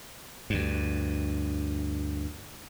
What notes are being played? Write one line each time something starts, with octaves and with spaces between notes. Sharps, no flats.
D2 G2